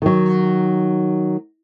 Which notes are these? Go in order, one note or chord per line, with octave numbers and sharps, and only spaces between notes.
D#3 F#3